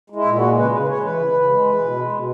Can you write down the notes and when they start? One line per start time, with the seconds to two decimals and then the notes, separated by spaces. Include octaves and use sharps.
0.10 G#3
0.16 E4
0.25 A#2
0.36 F#4
0.41 G#3
0.57 C#3 B4
0.71 C#3 B4
0.82 B4
0.87 G#3 C#5
1.03 E3 B4
1.19 C#3
1.33 C#3
1.50 G#3
1.65 E3
1.80 B2
1.96 G#3
2.12 B2